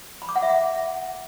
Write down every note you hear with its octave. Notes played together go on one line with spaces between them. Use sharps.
B5
D6
F#5
E5
F#5